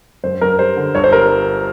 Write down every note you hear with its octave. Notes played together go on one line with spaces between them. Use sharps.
F#2 C5
F#2 A#4
G3 C5
D3
G1 C#5
C5
G3 A#4